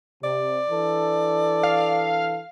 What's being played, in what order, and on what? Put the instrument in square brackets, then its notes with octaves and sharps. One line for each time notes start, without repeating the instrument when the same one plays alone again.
[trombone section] C3 [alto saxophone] D5
[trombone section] E3 D4 A4
[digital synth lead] F5